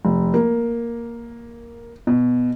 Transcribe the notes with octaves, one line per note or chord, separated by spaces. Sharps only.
F1
A#3
B2